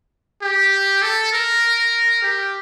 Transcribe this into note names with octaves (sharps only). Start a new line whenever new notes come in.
G4
A4
A#4
G4